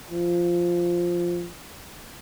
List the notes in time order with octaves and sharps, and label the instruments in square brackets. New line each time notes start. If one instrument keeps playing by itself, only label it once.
[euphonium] F3